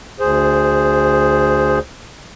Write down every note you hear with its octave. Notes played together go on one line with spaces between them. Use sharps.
D2 G#4 C5